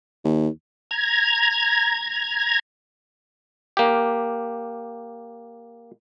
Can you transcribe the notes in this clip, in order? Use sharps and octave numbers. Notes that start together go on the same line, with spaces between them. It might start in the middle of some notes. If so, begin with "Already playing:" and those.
D#2
A#5 G#6
A#3 G4